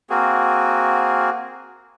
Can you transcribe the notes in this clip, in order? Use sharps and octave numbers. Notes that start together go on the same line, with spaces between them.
A#3 C4 F#4 G#4